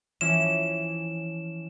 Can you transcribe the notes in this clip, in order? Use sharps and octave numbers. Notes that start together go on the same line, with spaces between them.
E3 F3 C#4 E7